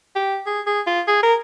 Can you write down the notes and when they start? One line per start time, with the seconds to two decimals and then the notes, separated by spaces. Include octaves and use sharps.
0.16 G4
0.47 G#4
0.67 G#4
0.87 F4
1.08 G#4
1.23 A#4